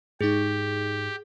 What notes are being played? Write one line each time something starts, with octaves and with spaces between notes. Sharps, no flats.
G#2 D#4 G4 G#4